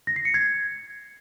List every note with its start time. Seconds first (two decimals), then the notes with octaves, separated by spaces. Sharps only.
0.07 A#6
0.16 C7
0.25 C#7
0.34 G#6